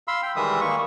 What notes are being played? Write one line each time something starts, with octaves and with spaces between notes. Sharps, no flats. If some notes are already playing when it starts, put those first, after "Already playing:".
F5 B5 C6 E6
G5
D#3 E3 G3 G#3 E5 D#6
D#3 A#3 C#6